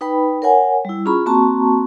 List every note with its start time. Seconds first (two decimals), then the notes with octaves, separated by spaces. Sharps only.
0.01 D#4 B4 G5 B5
0.42 A#4 C#5 F#5 G#5
0.85 G3 E4
1.06 C#4 F4 G#4 A#5 B5 C#6
1.26 A#3 C4 F#4 A5 A#5 C#6